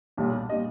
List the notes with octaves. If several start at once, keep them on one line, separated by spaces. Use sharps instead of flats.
B1 A#2 G3
A#2 G3 D#5